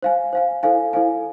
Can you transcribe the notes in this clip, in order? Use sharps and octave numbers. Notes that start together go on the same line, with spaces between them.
C5 F5 G#5
C5 F5 G#5
E4 A4 C5 F5 G#5
E4 A4 C5 F5 G#5